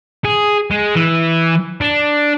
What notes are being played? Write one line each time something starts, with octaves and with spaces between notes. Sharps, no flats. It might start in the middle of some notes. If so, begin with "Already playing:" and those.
G#4
G#3
E3
D4